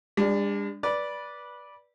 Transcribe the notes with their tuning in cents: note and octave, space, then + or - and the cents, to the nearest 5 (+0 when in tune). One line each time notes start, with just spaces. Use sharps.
G#3 -45 D4 +0
B4 -20 D5 -10